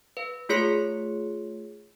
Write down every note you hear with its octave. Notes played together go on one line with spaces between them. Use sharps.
B4 F5
A3 F4 G#4 C#5 C6 C#7